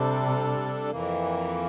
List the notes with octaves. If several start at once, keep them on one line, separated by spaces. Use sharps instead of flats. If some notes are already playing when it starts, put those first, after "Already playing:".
Already playing: C3 G3 D4 A4
F2 E3 A#3